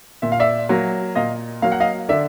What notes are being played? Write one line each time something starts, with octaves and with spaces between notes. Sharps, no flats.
A#2 E5
F5
D5 E5
F#3 A#3
A#2 D#5 F5
F#3 A#3 F5
F#5
D#5 F5
D3 D5 E5